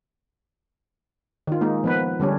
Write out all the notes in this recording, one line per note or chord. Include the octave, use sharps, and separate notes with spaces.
D#3 F4
G#3 A#3 D#4
F3 B3 B4
D3 G3 C#4 D4